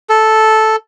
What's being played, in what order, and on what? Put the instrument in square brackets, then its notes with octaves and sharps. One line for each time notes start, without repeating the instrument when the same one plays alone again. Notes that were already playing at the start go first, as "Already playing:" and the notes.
[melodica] A4